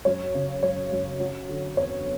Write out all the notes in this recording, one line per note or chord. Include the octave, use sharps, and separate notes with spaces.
F#2 C#5
C#3
F#2 C#5
F#2
F#3
D3
E2 C#5